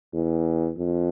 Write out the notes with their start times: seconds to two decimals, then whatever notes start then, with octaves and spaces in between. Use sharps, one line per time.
0.13 E2
0.77 F2